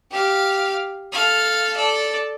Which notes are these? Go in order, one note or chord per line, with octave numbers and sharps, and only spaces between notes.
G4 F5
A4 F5
A4 D5